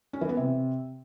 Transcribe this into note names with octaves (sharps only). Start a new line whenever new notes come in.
C#4
E3
B3
C3